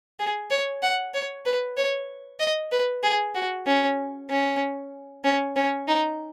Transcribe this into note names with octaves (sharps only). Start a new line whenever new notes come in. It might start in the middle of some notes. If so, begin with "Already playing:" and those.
G#4
C#5
F#5
C#5
B4
C#5
D#5
B4
G#4
F#4
C#4
C#4
C#4
C#4
D#4